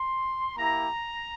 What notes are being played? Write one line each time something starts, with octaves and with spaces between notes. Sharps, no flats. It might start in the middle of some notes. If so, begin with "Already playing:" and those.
Already playing: C6
A#3 E4 G4 A#5